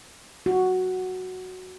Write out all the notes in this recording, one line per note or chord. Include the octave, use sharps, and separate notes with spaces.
F#4